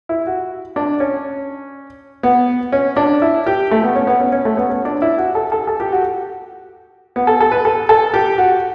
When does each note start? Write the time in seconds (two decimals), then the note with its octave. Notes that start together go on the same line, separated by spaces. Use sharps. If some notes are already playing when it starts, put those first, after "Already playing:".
0.09 E4
0.27 F#4
0.76 D4
1.00 C#4
2.23 B3
2.72 C#4
2.96 D4
3.22 E4
3.47 G4
3.71 A3
3.83 B3
3.95 C#4
4.07 B3
4.20 C#4
4.32 C#4
4.45 A3
4.57 B3
4.69 C#4
4.85 D4
5.02 E4
5.18 F#4
5.35 A4
5.52 A4
5.67 A4
5.80 G4
5.92 F#4
7.16 B3
7.27 A4
7.41 A4
7.52 B4
7.65 A4
7.89 A4
8.14 G4
8.38 F#4